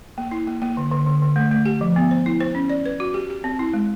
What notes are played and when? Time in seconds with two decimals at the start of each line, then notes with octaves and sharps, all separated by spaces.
0.18 A#3
0.31 E4
0.47 A#3
0.62 A#3
0.77 D3
0.92 D3
1.06 D3
1.22 D3
1.36 A3
1.52 A3
1.66 G4
1.81 F3
1.96 B3
2.11 C5
2.26 E4
2.41 C5
2.55 C#4
2.69 D5
2.86 B4
3.00 F#4
3.14 G4
3.30 G4
3.44 C4
3.59 E4
3.74 G#3